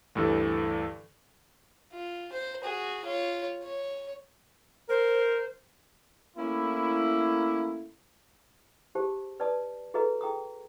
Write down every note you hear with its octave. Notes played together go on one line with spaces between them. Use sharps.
D2 G2 E3 A4
F4
C5
F#4 G#4
F4 C#5
C#5
A#4 C5
A3 A#3 C#4 E4
G4 G#4 C5 A5
B4 D5 D#5 A5 D#6
F#4 G#4 A4 B4 D#5 A#5
G#4 G5 A#5 D#6